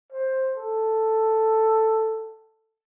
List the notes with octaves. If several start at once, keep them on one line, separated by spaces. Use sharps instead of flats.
C5
A4